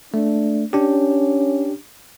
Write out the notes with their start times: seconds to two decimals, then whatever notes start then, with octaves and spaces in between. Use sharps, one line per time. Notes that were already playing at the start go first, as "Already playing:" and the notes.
0.14 A3 D4
0.73 C#4 D4 G4